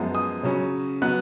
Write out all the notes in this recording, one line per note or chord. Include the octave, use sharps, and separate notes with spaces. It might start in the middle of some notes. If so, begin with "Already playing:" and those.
Already playing: F#2 F3 G#3 B3
D#6
C#3 F#3 C#4
F#3 B3 F#6